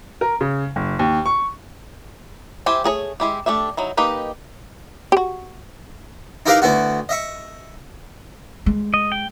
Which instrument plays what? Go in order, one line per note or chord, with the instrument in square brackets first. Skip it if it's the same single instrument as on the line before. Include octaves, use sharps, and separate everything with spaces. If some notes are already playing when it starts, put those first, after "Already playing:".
[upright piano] A#4
C#3
F#1
D#2
C#6
[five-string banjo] E4 G4 C5 E5 G#5
A3 G#4 A#4 C#5
G#3 E4 G4
A3 D4 G4 E5
F#3 D#4 E4
A#3 D#4 G4 B4
[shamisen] F#4 G4
[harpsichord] D#4 E4 G4 A#4 B4 F5
D2 B3 E4 F#4
D#5 E5 C#6
[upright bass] G#3
[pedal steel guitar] D#5
G5